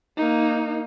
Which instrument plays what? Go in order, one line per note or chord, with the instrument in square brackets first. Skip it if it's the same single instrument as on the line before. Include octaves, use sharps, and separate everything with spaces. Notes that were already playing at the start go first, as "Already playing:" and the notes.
[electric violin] A#3 D#4